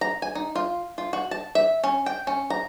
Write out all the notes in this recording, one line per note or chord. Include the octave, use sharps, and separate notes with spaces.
A#5
G#5
D#4
F4
F4
F#4
A5
E5
C#4
G5
C#4
A#5